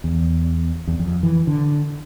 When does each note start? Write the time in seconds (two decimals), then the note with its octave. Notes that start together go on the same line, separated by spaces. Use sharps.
0.04 E2
0.88 E2
0.99 F2
1.23 E3
1.47 D3